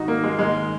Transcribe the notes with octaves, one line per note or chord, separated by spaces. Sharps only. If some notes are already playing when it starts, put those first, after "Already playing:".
Already playing: G#2 D#3 D#4 F#4
A#3
G#3
G#2 D#3 G#3